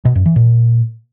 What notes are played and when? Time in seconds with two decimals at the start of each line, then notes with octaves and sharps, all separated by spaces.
0.05 B2
0.15 F#2
0.26 E3
0.36 A#2